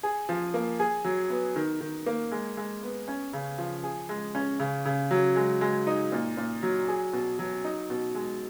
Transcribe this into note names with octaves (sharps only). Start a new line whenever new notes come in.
G#4
F3
A#3
G#4
F#3
B3
D#3
D#3
A#3
G#3
G#3
B3
C#4
C#3
F3
G#4
G#3
C#4
C#3
C#3
F#3
G#3
G#3
D#4
A#2
A#2
F#3
G#4
B2
F#3
D#4
B2
G#3